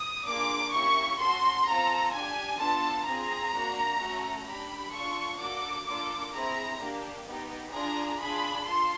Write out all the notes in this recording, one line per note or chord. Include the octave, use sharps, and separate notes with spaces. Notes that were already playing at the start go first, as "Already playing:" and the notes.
Already playing: D#6
A#3 D4 F4 G#4 D6
A#3 C#4 E4 G4 C#6
C#4 F#4 A4 C6
C4 F4 A4 A#5
D4 G4 G#5
B3 D4 F4 A4 A5
C4 F4 G#4 A#5
A#3 D4 F#4
A3 C#4 F#4
D4 G4 B5
D4 F4 A4 C#6
A#3 D4 F#4 A4 D6
A#3 D4 F4 A4 D6
C4 E4 G#4 A#5
A#3 D4 G4
B3 D#4 G4
D4 F4 G#4 A#5
D4 F4 G#4 B5
F4 A4 C6